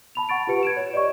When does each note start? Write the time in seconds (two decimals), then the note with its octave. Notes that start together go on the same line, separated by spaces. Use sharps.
0.15 A5 B5 F7
0.29 F#5 C#6 A6 D7
0.47 F4 G4 B4 C#7 D7
0.63 G#6 D7 E7
0.77 C#5
0.94 D5 D#5 C#6